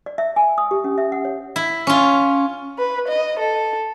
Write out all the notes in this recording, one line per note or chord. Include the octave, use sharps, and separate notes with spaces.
D5
E5
G#5
D#6
G4
C#4
E5
F#5
C#5
E4
C#4 F4
B4
D#5
A4